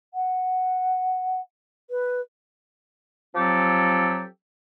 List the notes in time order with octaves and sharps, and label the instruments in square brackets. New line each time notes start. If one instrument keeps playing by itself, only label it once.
[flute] F#5
B4
[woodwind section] F3 F#3 C4 G4 A4